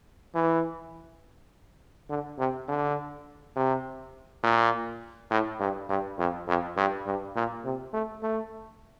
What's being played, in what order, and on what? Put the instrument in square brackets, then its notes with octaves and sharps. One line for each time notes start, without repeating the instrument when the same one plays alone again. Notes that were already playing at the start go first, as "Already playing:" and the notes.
[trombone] E3
D3
C3
D3
C3
A#2
A2
G2
G2
F2
F2
G2
G2
A#2
C3
A3
A3